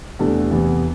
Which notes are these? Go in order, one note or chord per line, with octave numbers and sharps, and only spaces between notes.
E2 C3 A3 D4
E2 C3 E3